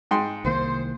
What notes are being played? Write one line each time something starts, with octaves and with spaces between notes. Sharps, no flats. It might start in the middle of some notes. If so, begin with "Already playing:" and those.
G#2 G5 C6
C2 D#3 A#3 C5